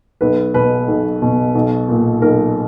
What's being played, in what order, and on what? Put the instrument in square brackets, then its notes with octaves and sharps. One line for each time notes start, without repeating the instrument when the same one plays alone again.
[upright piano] B1 B4
B2 B4
B1
B2
B1
A#2
B1 A#4